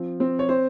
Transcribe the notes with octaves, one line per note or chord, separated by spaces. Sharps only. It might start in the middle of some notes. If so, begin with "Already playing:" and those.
Already playing: F3 C4
C4
C#5
C4 C5